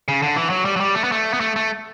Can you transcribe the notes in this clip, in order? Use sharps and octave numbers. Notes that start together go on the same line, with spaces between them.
C#3
D3
E3
F#3
G3
F#3
G3
A3
B3
A3
B3
A3
A3